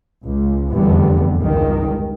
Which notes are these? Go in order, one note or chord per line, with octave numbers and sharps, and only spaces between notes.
C#2
F1 E2 G2 D3 G3 B3
G#1 C#2 G2 D#3